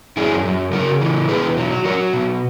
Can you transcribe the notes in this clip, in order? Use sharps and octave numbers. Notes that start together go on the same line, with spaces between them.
F#2 E4 G#4
F#2
C#3 F#4 A#4
E3
B2 G#4 B4
F#3
F#3 F#4 A#4
B2